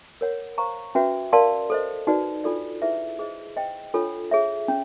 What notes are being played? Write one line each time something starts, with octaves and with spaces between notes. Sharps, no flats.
A#4 C#5 F#5
C5 F5 A#5 C#6
C#4 F#4 B4 E5
A#4 D5 F5 A5 C6
A4 C5 D#5
D#4 F#4 B4 D5
D4 F4 A4 D5
E4 G#4 B4 E5
G#4 C5 D#5
C5 D#5 G5
D4 F4 A4 C#5
G#4 C#5 E5
C#4